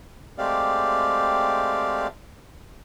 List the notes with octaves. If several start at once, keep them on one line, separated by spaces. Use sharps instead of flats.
G#3 A3 C4 G4 D5 F5